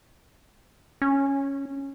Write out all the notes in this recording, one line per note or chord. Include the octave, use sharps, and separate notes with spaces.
C#4